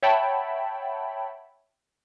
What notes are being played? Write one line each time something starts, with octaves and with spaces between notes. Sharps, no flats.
C#5 E5 F#5 G5 A5 B5